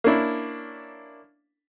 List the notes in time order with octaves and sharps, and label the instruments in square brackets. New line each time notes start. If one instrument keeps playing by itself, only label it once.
[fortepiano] A#3 C#4 D4 E4